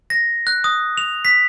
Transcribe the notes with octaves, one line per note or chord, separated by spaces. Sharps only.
A#6
F#6
D#6
F7
B6